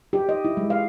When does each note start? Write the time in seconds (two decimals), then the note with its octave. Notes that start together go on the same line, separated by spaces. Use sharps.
0.13 G4
0.29 D#5
0.45 E4
0.57 G#3
0.70 F5